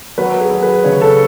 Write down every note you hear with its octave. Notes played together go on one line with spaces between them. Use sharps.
F#3 B4
G#4
F#3
B4
C#3 C#5
A4